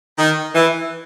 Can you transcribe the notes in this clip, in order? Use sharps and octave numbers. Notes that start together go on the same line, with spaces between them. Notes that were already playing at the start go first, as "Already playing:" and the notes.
D#3
E3